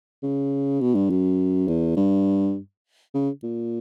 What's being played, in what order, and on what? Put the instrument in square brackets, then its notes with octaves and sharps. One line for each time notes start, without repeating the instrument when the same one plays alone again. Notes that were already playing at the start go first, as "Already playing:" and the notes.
[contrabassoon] C#3
B2
G2
F#2
E2
G2
C#3
A#2